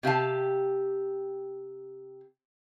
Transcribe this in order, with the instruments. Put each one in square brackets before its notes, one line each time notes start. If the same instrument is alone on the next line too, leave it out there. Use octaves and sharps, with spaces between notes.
[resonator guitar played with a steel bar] C3 G4 F5 A5